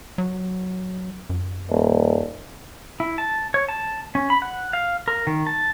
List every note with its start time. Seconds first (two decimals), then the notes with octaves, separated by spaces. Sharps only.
0.18 F#3
1.30 F#2
1.70 D#1
3.00 E4
3.18 A5
3.54 C#5
3.68 A5
4.15 C#4
4.30 B5
4.42 F#5
4.73 F5
5.08 A#4
5.27 D#3
5.47 A5